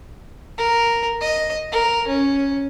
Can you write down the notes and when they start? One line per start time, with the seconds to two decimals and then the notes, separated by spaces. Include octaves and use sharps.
0.58 A#4
1.21 D#5
1.72 A#4
2.07 C#4